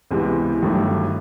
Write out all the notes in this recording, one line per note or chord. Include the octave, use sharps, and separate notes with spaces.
C#2 C3 E3 G#3 B3
G1 G2 D#3 F#3 A3